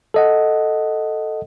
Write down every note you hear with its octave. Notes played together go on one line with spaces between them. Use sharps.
A4 D#5 F#5